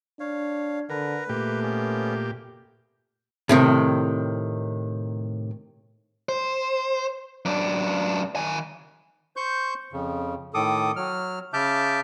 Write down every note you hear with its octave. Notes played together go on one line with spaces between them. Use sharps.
D4 C#5 F5
D3 A#4 B4
A#2 A3 G4
B3 C#4
A2 C3 D#3
C5
F#2 D4
D#3 G#5
C5 C#6 G6
F2 C#3
A2 D#3 A4 D6 D#6
F#3 F6
C#3 E5 A5 D6 F6 G6